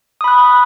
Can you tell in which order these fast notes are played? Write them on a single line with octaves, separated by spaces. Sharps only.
D#6 B5 F#6